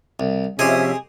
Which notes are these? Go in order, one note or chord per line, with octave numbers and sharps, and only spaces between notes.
C2
C3 F3 C#4 G4 G#4 C5 D#5 E5